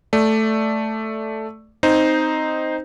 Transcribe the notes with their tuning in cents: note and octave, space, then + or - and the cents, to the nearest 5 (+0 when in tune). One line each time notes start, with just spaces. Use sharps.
A3 +0 D5 +0
C4 +0 D#4 +0 C5 +0